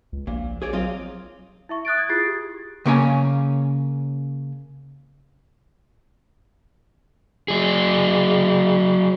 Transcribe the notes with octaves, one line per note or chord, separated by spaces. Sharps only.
C#2
A#1 A#2
G#4 C#5 D5
F#3 C4 F4 D#5
E4 E5 C#6
D#6 F#6 A6 D7
D#6 G#6
E4 F4 G#4 A6 C7
G4
C#3 A#3 C#4 G#5
F#3 G#4